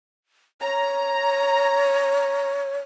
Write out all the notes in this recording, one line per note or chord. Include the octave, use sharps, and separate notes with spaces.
C#5 A#5